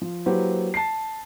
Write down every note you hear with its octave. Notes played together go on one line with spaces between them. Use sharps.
F3
F#3 A#3 E4 G4 B4 C5
A5 C7